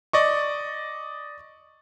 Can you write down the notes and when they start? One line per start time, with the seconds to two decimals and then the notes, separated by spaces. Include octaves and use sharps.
0.13 D5 D#5 C#6